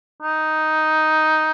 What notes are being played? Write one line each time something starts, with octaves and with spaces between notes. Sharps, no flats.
D#4